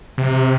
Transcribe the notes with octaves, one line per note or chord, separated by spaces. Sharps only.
C3